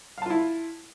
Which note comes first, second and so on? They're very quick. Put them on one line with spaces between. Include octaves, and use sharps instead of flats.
F5 A5 F4 E4